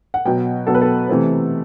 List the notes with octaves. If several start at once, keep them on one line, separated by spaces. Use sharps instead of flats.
F#5
B2 F#3 B3 G5
B2 F#3 B3 A4
B4
A4
C3 E3 A3 C4